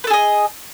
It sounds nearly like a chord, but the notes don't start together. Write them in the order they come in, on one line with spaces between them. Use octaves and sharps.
B4 A4 G#4 D#5